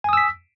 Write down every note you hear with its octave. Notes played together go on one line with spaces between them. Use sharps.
G#5 D#6 E6 B6